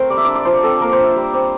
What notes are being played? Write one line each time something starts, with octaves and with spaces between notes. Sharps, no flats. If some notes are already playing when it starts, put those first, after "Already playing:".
Already playing: A3 C4 A#4 C5
G3 D5
E5
D4 D5
D5
F3 C5
C4 A4
A#3 A#4
C5
D4
E5
G3
C4